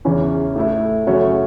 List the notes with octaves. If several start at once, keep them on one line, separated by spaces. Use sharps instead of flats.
E2 C#3 E3 C#4
A2 A3 E4
F#2 C#3 A3 C#4 F#4